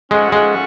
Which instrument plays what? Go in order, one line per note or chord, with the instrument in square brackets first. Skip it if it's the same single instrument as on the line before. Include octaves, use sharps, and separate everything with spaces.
[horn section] G#2 F3 A3 C#4 F#4 [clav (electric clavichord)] G#3
[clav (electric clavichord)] G#3